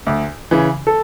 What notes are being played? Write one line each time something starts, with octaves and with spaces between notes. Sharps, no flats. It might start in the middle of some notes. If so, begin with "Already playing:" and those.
D2
C#3 E3
A4